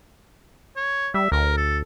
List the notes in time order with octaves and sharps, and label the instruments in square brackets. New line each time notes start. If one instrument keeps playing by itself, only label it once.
[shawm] C#5
[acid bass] G3 [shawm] E5
[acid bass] D2 [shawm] A#4
[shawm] A4